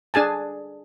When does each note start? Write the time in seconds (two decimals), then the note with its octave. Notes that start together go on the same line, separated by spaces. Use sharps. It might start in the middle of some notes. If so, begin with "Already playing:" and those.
0.14 D4 G#4 G#5 A5